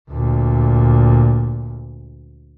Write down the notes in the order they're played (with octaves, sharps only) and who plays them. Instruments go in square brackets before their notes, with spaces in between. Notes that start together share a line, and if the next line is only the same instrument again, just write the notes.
[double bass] D2 A#2